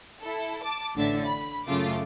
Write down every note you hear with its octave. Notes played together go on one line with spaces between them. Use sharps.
E4 A4
A5 D6
A1 A2 D3 E5 A6
B5
F#2 C#3 A3 F4 D6